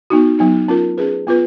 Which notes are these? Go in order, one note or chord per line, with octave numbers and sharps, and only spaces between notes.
B3 D#4 F#4
F#3 B3 D#4
C#4 F4 A#4
C#4 G#4 B4
B3 F4 B4